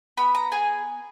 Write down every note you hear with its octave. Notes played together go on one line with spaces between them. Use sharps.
B3 B5
A#5
G#4 G#5